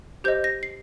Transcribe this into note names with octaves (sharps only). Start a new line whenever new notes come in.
G4 C5 D#5 G6
A#6
C7